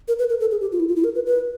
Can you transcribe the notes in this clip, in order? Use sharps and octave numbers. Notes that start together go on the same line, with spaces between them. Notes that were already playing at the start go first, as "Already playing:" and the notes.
A#4
B4
A#4
A4
G#4
G4
F4
E4
F4
E4
A#4
B4
B4